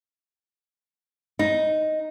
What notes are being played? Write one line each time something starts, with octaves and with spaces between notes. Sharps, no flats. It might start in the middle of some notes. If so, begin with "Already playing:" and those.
D#4